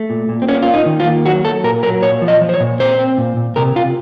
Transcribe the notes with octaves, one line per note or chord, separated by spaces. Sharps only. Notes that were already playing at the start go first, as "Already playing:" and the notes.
Already playing: A3
A#2
A#2
C4
A#3 C#4
A#3 F4
D#4
D#3
F4
A#3
F#3 F#4
F#3 A4
A#2 A#4
F#3 A#4
A#2 C#5
F3
D#5
F3
C5
C#5
A#2
C4 C5
C4
A#2
A#2
C3 A#4
C3 F4